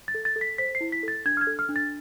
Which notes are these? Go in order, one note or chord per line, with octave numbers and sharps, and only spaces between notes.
A6
A4
A6
A4
B6
C5 B6
C7
E4
B6
A4 A6
D4 G#6
F6
G#6
A4
F6
D4
A6